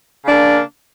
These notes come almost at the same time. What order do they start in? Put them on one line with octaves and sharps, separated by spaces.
C#3 D4 A#3